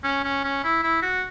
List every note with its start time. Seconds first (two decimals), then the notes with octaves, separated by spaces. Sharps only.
0.04 C#4
0.24 C#4
0.44 C#4
0.64 E4
0.84 E4
1.02 F#4